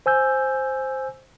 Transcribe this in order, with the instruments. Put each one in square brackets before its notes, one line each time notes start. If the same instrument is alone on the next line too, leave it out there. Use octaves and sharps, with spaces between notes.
[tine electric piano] C5 G#5 E6 G6